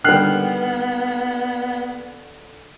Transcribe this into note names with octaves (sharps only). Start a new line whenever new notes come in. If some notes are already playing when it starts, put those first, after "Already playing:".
D3 D#3 G3 B3 G5 F6 F#6 C7